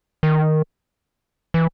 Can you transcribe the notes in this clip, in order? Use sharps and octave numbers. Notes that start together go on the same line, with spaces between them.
D#3
E3